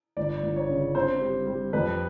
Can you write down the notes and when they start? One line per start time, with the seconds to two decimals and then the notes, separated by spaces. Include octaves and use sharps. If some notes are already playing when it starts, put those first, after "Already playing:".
0.17 G1 D5
0.44 G1
0.56 C#5
0.70 C#3
0.95 C4 C5
1.21 G3
1.47 G3
1.73 F2 B4